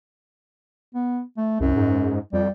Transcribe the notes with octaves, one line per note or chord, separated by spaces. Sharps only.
B3
A3
C2 F#2
G#2
F2 G3